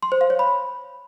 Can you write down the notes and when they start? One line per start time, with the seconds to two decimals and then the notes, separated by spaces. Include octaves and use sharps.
0.03 C6
0.12 C5
0.21 F5
0.30 C#5
0.39 B5